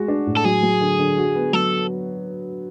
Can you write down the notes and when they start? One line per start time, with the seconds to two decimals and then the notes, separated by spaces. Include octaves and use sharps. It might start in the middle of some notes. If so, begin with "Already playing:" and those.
Already playing: G#3 F#4
0.08 D4
0.27 A2
0.37 A4
0.45 F#3 G#4
0.63 F#3
0.81 D3
0.99 D3
1.18 F#4
1.35 B3
1.53 F#3 A4